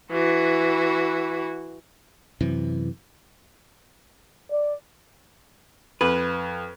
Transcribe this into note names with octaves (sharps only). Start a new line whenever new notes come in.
E3 F#4
F#2 C3 E3
D5
F2 B4